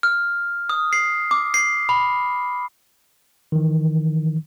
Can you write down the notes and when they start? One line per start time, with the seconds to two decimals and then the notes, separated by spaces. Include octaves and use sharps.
0.03 F6
0.69 D#6
0.93 C7
1.31 D6
1.54 C7
1.89 B5
3.52 D#3 E3